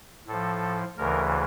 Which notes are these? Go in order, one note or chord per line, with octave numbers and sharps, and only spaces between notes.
A2 F3 A4
D2 C#3 E3 A#4